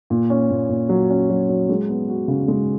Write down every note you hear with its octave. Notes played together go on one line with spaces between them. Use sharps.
A#2
C#4
A#2
A#2
F#3
C#4
F#3
F#3
G#3
B3
F#4
C#3
G#3